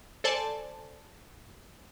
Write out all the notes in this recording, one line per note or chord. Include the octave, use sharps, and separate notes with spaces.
A4 C5 D5 G#5 A5